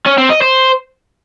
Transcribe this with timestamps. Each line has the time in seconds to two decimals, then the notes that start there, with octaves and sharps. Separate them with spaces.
0.06 C#4
0.18 C4
0.30 D#5
0.42 C5